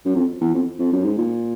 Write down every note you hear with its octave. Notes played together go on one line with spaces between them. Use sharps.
F#2
F2
E2
F2
F2
F#2
G#2
A#2